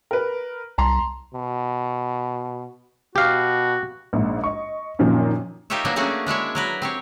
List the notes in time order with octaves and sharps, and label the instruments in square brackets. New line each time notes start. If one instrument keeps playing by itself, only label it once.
[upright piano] A#4 B4
[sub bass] C2 [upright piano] A5 A#5 C6
[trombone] B2
[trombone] B2 [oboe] F#4 [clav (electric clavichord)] G4 F5
[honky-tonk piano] A#1 G#2
D#5 C#6
F#2 A#2 D#3 F3 C4 C#4
[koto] D#4 F4 G4 A#4 C#5 E5
F3 F#3 A#3 B3 D4
A3 A#3 C#4 D4 F#4 G#4
G#3 D4 E4 C#5
F#3 A#4 B4
C4 G4 C#5